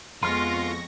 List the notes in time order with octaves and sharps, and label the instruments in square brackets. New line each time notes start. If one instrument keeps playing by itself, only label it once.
[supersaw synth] F2 C#6 A#6 [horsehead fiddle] G#3 B3 [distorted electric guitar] F4 [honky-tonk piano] C6 F6